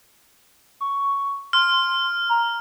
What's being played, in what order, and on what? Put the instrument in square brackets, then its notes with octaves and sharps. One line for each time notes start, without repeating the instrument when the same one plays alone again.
[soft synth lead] C#6
[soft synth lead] C6 [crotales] F6
[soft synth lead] A#5